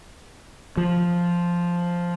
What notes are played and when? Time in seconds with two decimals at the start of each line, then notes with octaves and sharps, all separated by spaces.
0.77 F3